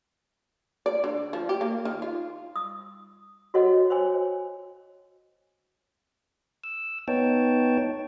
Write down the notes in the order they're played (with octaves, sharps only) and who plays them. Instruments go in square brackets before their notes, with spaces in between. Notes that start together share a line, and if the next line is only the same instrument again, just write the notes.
[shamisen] D5
D3
F3
G4
A#3
D#3
F4
[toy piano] D#6
F#4 A4 C#5 D#5 F#5
C5 C#5 G#5
[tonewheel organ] E6
B3 D#4 C#5 G5 A5